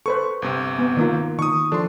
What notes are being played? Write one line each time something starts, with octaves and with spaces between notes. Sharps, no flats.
A4 B4 C5 C#6
G1 C3
B3
D#3 A#3 F4
D#3 C#6 D#6
F3 D4 A4 C6